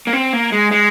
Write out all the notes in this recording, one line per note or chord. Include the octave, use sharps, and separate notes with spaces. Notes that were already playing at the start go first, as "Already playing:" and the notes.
A#3
C4
A#3
G#3
G#3